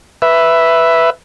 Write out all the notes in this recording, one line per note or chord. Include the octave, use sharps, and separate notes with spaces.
B4 E5